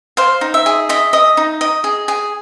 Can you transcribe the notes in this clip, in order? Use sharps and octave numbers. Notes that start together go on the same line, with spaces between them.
C5 F5
D#4
E5
G#4
D#5 E5
D#5
D#4
D#5
G#4
G#4